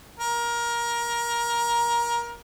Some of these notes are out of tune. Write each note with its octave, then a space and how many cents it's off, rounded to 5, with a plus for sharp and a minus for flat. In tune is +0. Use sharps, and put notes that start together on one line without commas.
A#4 +20